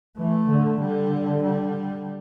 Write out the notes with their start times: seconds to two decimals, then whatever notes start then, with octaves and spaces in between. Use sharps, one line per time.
0.18 E3 A3
0.49 D3
0.80 D3 G3
1.43 G3